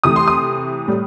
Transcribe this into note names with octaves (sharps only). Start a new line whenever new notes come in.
C3 E3 A3 D#6
C6
D#6
A2 G3